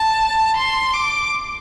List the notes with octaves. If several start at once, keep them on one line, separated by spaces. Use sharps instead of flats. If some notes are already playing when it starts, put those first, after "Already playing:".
Already playing: A5
C6
D6